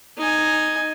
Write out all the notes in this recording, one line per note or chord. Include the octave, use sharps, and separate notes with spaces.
D#4 G#5